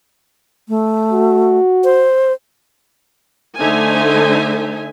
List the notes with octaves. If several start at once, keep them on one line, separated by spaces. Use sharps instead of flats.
A3
F#4
C5
D3 A3 D#4 C5 E5 G#5